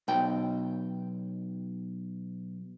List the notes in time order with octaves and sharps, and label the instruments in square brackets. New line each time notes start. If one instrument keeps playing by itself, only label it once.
[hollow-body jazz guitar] B1 G5